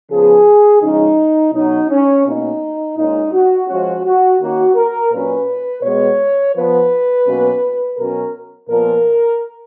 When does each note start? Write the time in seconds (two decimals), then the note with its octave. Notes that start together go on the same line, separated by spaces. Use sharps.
0.10 C#3 F3 B3 G#4
0.82 C#3 F3 G#3 C#4 D#4
1.53 B2 F#3 C#4 D#4
1.90 C#4
2.25 B2 A#3 C#4 D#4
2.97 A#2 G#3 C#4 D#4
3.33 F#4
3.68 F3 G#3 C#4 F#4
4.04 F#4
4.40 D#3 A#3 C#4 F#4
4.75 A#4
5.11 A#2 F#3 C#4 B4
5.83 B2 G#3 B3 C#5
6.54 F3 B3 B4
7.26 B2 F#3 A#3 C#4
7.97 B2 F#3 C#4 A#4
8.69 A#2 F3 B3 A#4